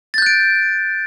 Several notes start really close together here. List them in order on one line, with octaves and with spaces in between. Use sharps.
A6 G6 F#6 D7